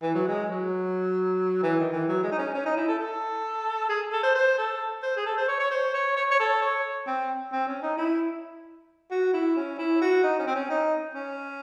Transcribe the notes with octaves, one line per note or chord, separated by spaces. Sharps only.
E3
F#3
G#3
F#3
E3
D#3
E3
F#3
G#3
D#4
C#4
C#4
D#4
E4
A4
A4
G#4
A4
C5
C5
A4
C5
G#4
A4
C5
C#5
C#5
C5
C#5
C#5
C#5
A4
C#5
C4
C4
C#4
D#4
E4
F#4
E4
C#4
E4
F#4
D#4
C#4
C4
C#4
D#4
C#4